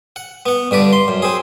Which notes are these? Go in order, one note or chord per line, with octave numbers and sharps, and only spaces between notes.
F#5
B3 F#5
G2 D3 B4 D5
C6
F#2
C4 G#4